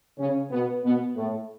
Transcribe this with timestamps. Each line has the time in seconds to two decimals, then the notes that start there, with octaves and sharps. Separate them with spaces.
0.18 C#3 C#4
0.51 B2 B3
0.83 B2 B3
1.16 A2 A3